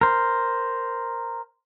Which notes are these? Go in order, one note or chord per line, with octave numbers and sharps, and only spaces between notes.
A#4 C5